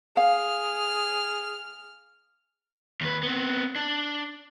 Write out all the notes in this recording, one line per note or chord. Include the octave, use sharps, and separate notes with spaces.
G#4 F5 F6
D#2 B4
B3 C4
D4